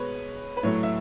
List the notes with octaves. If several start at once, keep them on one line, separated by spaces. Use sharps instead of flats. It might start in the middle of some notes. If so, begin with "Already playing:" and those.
Already playing: B2 G#3 B4 C#5
B4
A2 F#3 A3 C#5
E5